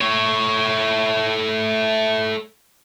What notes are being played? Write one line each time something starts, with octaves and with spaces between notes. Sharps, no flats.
A3 C#5